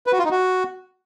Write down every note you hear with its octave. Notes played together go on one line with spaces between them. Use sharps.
B4
F#4
F4
D#4
F#4